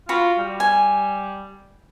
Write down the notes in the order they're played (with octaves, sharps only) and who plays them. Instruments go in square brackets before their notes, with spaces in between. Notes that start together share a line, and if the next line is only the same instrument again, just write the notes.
[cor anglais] F4 [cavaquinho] F#4 B5
[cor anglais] G3
[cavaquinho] G#5